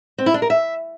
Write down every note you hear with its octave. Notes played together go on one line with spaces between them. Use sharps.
C4
E4
D4
A#4
E5